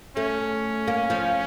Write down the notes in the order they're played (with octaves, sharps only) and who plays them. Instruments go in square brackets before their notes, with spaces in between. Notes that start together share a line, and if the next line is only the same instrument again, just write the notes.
[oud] A3 [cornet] C#4
[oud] A#3
F3